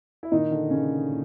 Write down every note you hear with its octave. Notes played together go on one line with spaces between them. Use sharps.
E4
A#2 D#3 D#4
D3 D4
A#2 C#3 C#4
A#2